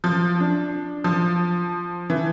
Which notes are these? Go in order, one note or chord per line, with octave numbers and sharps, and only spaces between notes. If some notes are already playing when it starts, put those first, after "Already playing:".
F3
D4
F3
E3